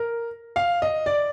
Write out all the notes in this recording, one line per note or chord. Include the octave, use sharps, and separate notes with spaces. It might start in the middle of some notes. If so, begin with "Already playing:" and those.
Already playing: A#4
F5
D#5
D5